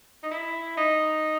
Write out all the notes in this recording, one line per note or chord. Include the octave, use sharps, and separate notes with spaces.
D#4
E4
D#4